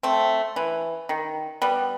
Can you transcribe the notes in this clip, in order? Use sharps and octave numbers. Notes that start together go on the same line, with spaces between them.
A3 C4
E3
D#3
G3 B3